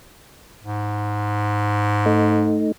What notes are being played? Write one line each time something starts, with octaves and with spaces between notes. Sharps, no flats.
G#2
A3 D#4